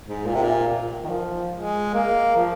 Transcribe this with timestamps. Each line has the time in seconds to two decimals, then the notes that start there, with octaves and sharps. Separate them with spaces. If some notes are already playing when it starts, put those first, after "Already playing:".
0.05 G#2
0.26 A#2
0.35 C3
0.43 A#2
1.04 D#3
1.10 F3
1.52 G#3
1.94 A#3
2.36 F3